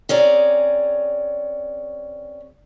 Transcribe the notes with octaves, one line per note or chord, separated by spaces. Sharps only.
C4 C#4 G#4 D5 A#5